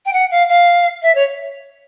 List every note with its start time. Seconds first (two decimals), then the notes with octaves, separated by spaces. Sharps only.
0.05 G5
0.12 F#5
0.30 F5
0.48 F5
1.02 E5
1.15 C#5